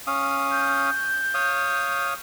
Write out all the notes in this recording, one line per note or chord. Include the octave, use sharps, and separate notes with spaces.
C#4 F5 D#6
G6
C#5 F5 D#6